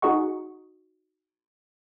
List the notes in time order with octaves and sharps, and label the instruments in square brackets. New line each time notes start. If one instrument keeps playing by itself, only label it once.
[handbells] D#4 F#4 G#4 D#5 F#5 C#6